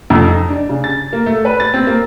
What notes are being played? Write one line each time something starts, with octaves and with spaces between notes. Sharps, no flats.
F2
D#4
D4
C#3
A6
A#3
A3
B4
A6
C4
A#3